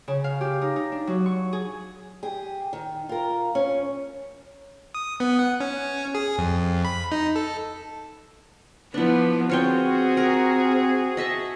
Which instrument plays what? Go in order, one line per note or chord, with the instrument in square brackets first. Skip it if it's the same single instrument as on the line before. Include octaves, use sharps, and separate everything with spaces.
[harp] C#3
F5
G4
D#4
D#4
D4
F#3
C#6
G#4
[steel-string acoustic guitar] G4 G#4
D#3
F4 A#4
C#4
[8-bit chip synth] D#6
B3
F#5
C#4
G#4
F2
B5
D#4
A4
[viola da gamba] F3 B3 B4 [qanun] D4 E4
[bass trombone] C4 [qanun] F4 C#5 G5 [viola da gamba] F#4 G#4
[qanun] A#4
D#5 E5 A5